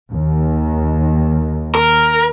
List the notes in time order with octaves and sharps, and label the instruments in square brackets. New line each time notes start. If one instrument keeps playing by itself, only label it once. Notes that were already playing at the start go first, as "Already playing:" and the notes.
[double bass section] D#2 D#3
[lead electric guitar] A#4